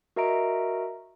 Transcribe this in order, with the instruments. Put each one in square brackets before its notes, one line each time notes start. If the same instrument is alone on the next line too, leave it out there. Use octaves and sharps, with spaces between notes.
[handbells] F#4 A#4 D#5 E5 A#5 D7